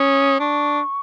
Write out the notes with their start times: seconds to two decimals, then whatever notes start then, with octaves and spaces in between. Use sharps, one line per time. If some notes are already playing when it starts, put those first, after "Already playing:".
Already playing: C#4 D#6
0.40 D4 C#6